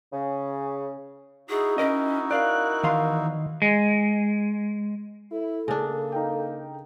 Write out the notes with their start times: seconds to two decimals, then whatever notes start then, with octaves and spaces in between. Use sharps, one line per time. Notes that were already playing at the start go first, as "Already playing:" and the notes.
0.13 C#3
1.50 D#4 E4 F#4 G#4
1.78 C#4 A#4 D#5
2.31 A#4 D5 F5 F#6
2.83 E2 D#3 F5 C6
3.62 G#3
5.32 E4 A4
5.68 C#3 A#3 D4
6.12 D#4 F5 G5